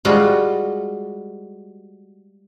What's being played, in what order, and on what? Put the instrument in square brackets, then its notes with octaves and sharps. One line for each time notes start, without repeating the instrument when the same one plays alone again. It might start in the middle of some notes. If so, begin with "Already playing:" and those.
[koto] F3 G3 G#3 F4 F#4